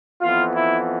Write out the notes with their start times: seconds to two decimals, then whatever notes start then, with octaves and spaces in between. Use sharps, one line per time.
0.21 F2 E3 B3 F4
0.54 E4